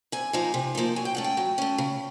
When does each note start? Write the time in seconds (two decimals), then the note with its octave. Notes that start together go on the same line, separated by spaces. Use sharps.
0.12 C3 G#5
0.33 F3 A#3 D#4
0.54 C3
0.75 F3 A#3 D#4
0.96 F#3 G#5
1.05 G5
1.15 A3 C#4 F#5
1.24 G5
1.37 F#3
1.58 A3 C#4
1.78 C#3